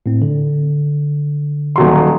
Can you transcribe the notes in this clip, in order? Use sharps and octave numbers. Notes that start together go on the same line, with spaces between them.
A2 C4
D3
D#1 F#3 C6